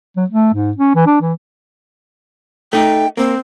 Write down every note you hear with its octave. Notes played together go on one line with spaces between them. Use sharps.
F#3
A3
G#2
C#4
E3
D4
E3
A3 D#4 G5
A#3 C4